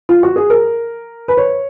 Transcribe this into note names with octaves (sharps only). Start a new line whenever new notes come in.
F4
F#4
G#4
A#4
B4
C#5